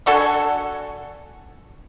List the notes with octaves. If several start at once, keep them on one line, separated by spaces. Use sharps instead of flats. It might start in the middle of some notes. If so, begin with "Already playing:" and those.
D4 F#4 A4 G#5